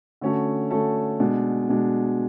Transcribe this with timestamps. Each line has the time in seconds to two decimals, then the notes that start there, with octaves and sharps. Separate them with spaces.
0.21 D3 A3 C#4 F#4 A4
0.71 D3 A3 C#4 F#4 A4
1.20 B2 G#3 D4
1.69 B2 G#3 D4